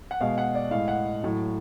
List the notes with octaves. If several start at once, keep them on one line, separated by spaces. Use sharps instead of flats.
F#5
B2 G#3 F5
F#5
D5
A2 G#3 F5
F#5
A2 F#3